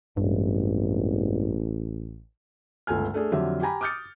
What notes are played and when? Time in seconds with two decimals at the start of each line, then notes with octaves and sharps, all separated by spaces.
0.17 E1 A1 G2
2.87 G1 C#2 A3 G#5 F6
3.14 A3 D4 G#4
3.32 F2 D3 F#3 G4 E5
3.61 G4 G5 G#5 A#5 B5
3.81 D6 D#6 F6 G6 A6 C#7